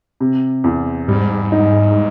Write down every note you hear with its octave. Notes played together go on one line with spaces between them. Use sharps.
C3
E2
G#2 G3
D#4